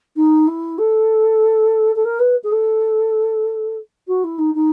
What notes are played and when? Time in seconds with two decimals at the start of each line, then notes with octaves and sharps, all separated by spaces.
0.16 D#4
0.47 E4
0.78 A4
1.96 A4
2.05 A#4
2.19 B4
2.44 G#4
2.52 A4
4.08 F#4
4.24 E4
4.38 D#4
4.55 D#4